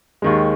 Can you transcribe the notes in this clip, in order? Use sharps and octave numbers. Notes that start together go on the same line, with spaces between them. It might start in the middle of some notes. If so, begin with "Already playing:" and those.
D#2 D#3 G#3